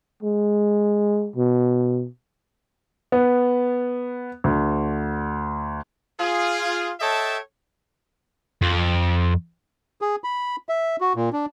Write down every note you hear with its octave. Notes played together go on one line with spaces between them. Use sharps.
G#3
B2
B3
D2
F4 G#4
A4 C#5 D#5 E5 G5 A5
F2
G#4
B5
E5
F#4
A#2
D4